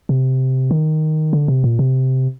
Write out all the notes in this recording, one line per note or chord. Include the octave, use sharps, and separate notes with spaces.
C3
D#3
D3
C3
A#2
C3